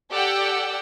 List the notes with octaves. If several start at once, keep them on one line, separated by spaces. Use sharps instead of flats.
G4 A4 D5 F#5 G5 E6